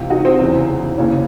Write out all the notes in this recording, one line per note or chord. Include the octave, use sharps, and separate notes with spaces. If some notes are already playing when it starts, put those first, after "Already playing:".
Already playing: C#2 C3 E3
D#4 F#4
C4
E2 C#3 E3
D#2 C#3 E3 C#4